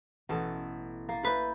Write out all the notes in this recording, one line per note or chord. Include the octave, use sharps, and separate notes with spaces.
A1 B2 A4 A5
A#3 A6
B4 E5 B5 G6